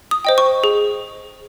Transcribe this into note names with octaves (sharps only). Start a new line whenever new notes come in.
D#6
C5 D#5 G5
C#6
G#4